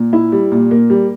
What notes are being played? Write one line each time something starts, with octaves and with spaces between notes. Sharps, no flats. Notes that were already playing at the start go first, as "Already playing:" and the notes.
Already playing: A#2
E4
G3
A#2
A#3
G3